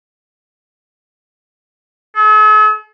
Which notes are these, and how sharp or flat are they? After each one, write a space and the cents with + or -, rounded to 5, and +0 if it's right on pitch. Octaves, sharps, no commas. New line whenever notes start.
A4 -45